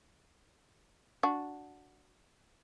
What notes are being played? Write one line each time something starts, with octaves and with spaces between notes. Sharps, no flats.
D4 F#4